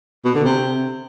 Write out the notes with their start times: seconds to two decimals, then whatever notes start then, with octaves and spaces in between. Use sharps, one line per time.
0.25 B2
0.35 D3
0.45 C3